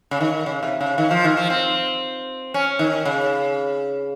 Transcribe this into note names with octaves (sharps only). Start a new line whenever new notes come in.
C#3
D#3
C#3
C3
C#3
D#3
F3
D#3
F3
C4
C#4
D#3
C#3